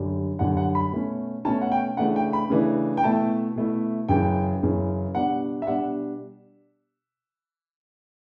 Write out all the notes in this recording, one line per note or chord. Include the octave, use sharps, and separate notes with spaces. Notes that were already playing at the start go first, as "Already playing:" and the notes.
Already playing: F#2 D3 G3
F#2 D3 G3 F#5
F#5
B5
B2 A3 C#4
B2 A3 C#4 A5
F#5
G5
C#3 E3 A3 D4 F#5
G5
B5
C#3 E3 A3 D4
G5
B2 A3 E4 A5
B2 A3 E4
F#2 C#3 E3 G5
F#2 C#3 E3
B2 G3 D4 F#5
E5
B2 G3 D4 F#5